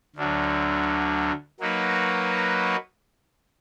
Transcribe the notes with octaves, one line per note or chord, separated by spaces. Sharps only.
D2 D3 F#3
F#3 A#3 D#4 F#4 B4